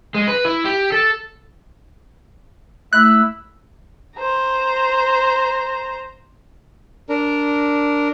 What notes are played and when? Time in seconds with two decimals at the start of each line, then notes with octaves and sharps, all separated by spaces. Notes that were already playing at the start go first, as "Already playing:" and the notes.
0.15 G#3
0.28 B4
0.45 E4
0.65 G4
0.92 A4
2.93 A3 E4 E5 F#6
4.17 C5 A#5
7.09 D4 A#4